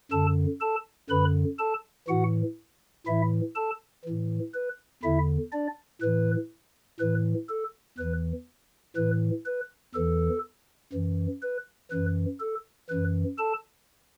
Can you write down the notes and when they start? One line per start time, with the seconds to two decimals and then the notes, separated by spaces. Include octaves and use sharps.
0.12 F#2 D3 A4 A5
0.61 A4 A5
1.10 F#2 D3 B4 B5
1.59 A4 A5
2.08 A2 E3 F#4 F#5
3.06 A2 E3 E4 E5
3.56 A4 A5
4.05 A2 E3
4.54 B4
5.03 E2 D3 E4 E5
5.52 D4 D5
6.01 A2 E3 B4
7.00 A2 E3 B4
7.49 A4
7.98 E2 E3 B4
8.96 A2 E3 B4
9.46 B4
9.95 E2 E3 A4
10.93 F#2 E3
11.42 B4
11.91 F#2 E3 B4
12.40 A4
12.89 F#2 E3 B4
13.38 A4 A5